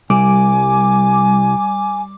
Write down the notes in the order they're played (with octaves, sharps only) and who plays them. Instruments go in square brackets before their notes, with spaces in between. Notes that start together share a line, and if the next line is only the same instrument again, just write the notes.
[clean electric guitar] C2 [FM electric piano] G3 D6 [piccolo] G#5